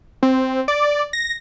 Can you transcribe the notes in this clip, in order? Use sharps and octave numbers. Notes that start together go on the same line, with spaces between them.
C4
D5
A#6